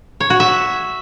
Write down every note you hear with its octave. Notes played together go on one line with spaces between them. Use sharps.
C#5
F#4
E5